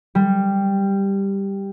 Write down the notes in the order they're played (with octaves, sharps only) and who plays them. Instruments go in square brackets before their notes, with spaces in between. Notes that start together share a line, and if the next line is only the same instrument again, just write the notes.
[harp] G3